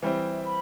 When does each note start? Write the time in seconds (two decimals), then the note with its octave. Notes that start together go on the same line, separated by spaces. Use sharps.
0.02 E3 G3 C4 E5
0.45 B5